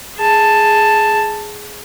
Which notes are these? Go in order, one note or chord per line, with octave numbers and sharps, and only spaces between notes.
G#4 A5